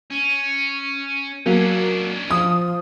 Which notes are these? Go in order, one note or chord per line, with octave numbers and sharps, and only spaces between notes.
C#4
F#3 A#3 C#4 D4
F3 D#6